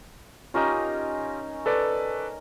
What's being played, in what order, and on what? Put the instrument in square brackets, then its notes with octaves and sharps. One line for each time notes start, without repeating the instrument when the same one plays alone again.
[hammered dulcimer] C#4 D#4 A#4 [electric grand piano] F4 G4 D#5
[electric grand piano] A4 B4 D5